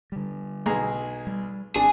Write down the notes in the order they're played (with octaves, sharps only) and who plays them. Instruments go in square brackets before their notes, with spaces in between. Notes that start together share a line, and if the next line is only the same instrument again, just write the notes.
[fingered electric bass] D3 G3
[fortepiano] B1 G#4 A#5
[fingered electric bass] G3
[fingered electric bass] G#1 C4 [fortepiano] D4 [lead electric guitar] G#4